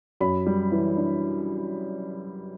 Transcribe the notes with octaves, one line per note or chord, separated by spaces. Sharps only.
F#2 B5
G3
E3
D4